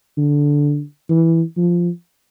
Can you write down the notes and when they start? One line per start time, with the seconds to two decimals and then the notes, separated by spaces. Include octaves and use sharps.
0.18 D3
1.09 E3
1.57 F3